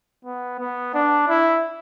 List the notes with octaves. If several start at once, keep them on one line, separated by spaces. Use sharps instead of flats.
B3
B3
D4
E4